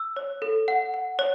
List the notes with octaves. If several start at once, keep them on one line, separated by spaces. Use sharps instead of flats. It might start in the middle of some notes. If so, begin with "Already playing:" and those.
Already playing: E6
C#5
A4
F#5
F#5
C#5